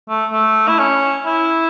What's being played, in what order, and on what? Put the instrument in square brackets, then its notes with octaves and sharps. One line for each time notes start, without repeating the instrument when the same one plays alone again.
[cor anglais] A3
A3
E4
C#4
E4